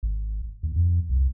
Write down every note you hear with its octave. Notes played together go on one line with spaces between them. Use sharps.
G#1
D#2
F2
C2